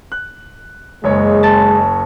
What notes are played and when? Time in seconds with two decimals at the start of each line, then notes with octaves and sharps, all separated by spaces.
0.12 F#6
1.04 F#1 G#3 C#5
1.43 A5